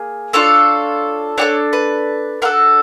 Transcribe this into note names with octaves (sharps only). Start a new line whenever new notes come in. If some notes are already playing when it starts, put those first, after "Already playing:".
Already playing: A#3 G#4
D4 F4 A4 C#5
D4 F#4 A4 C#5
B4
D4 F#4 A4 A#4